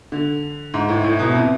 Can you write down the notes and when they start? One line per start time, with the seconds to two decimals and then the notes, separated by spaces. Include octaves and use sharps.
0.12 D3
0.74 G#2
0.89 A2
1.04 A2
1.19 B2
1.35 C3